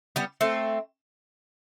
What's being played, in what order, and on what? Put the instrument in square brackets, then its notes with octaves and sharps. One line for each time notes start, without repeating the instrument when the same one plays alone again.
[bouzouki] G3 B3
A3 C4